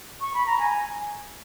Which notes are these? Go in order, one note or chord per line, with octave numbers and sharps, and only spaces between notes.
C#6
B5
A#5
G#5